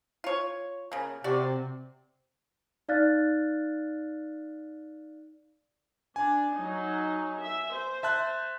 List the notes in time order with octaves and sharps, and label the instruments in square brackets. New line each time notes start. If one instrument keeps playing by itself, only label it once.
[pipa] F4 C#5
C#3 A#3
[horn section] C3 [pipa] F#4 D5
[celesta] D#4 D5 F5 F6 F#6 A6
[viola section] D4 [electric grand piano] G#5
[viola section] F#3 D#4
E5
C5
[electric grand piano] E5 A5 F#6